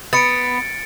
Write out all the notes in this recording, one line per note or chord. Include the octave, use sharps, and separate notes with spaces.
B3 A6 C#7 D7